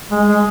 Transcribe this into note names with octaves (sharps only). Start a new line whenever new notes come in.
G#3
G#3